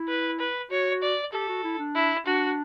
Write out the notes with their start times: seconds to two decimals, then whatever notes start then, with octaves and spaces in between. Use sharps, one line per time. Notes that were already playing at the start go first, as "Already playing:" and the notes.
Already playing: E4
0.09 B4
0.39 B4
0.71 F#4 C#5
1.02 D5
1.32 G4 A4
1.49 F#4
1.64 E4
1.79 D4
1.95 E4
2.26 D4 F#4